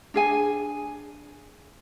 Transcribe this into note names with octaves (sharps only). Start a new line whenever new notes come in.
D4 G#4 G#5